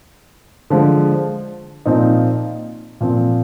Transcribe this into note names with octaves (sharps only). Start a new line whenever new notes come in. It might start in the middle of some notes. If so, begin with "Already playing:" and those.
D3 F3 G#3
A#2 F3 C4 D#4
A#2 F3 C4